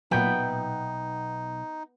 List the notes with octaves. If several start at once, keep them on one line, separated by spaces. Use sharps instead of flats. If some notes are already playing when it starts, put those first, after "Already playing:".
B1 A#2 F#3 B3 D#4 E5 G5